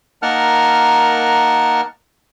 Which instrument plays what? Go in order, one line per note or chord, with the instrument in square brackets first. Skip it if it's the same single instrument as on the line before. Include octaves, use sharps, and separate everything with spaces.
[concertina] A#3 D#4 A#4 F#5 A5 F6